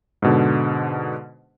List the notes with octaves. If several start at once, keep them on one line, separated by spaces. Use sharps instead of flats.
G#2 B2 D3